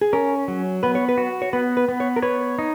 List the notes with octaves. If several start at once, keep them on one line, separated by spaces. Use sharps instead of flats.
G#4
C#4 A#4
F#3
B3 B4
C#5
B4
F#4
C#5
B3 B4
B4
B3
C#5
A#4
B4 C#5
D#4